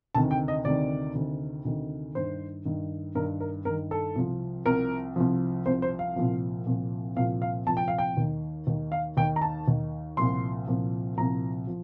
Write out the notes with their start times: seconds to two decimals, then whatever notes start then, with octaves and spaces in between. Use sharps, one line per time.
0.15 D2 C3 D#3 A5
0.31 G5
0.48 D#5
0.65 D2 C3 D#3 D5
1.15 D2 C3 D#3
1.65 D2 C3 D#3
2.15 G2 D#3 C5
2.65 G2 D#3
3.15 G2 D#3 A#4
3.40 A#4
3.65 G2 A#4
3.70 D#3
3.91 A4
4.15 C2 C3 F3
4.66 C2 C3 F3 A#4
5.16 C2 C3 F3
5.66 C2 C3 F3 C5
5.82 C5
5.99 F5
6.16 C2 A#2 F3
6.66 C2 A#2 F3
7.16 C2 A#2 F3 F5
7.42 F5
7.66 C2 A#2 F3 A5
7.77 G5
7.88 F5
7.98 G5
8.17 D#2 D#3
8.67 D#2 D#3
8.92 F5
9.17 D#2 D#3 G5
9.36 A#5
9.42 A5
9.68 D#2 D#3
10.17 C2 A#2 F3 C6
10.68 C2 A#2 F3
11.17 C2 A#2 F3 A#5
11.67 F3